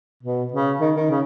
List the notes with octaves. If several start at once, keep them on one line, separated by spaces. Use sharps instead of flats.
B2
C#3
D#3
D#3
C#3